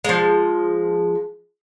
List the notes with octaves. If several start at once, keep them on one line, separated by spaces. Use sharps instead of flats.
F3 G#3